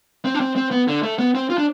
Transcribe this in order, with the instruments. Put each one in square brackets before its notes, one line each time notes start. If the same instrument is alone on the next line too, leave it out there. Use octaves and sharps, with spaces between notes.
[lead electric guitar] C4
D4
C4
C4
B3
D3
A3
B3
C4
F4
D4